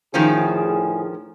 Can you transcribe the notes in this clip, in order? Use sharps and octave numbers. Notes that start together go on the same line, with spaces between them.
D2 A2 D#3 F3 C#4 G#4